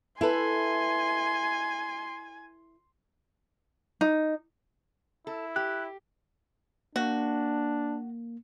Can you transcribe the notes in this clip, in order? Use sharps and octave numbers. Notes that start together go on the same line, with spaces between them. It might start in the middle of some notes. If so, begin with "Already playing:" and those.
E4 A4 B4 G#5 C6
D#4
E4 A4
G4 F#6
A#3 D4 F#4